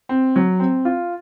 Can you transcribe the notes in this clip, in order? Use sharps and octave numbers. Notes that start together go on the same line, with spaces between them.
C4
F#3
C4
F4